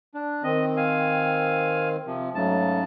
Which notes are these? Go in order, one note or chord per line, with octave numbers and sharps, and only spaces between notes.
D4
D#3 C4 D#5
F5 G#5
C3 F3
G#2 C#3 F#3 A3 A5